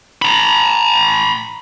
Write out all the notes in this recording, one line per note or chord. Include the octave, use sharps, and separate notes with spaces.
A#5 B5